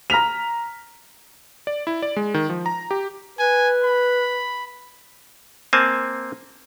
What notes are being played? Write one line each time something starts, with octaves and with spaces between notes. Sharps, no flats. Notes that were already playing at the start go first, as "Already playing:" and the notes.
A#5 F6 B6 F7
D5
E4
D5
G#3
D#3
F3
A#5
G4
B4 G#5
B5
A#3 C4 G#5 A5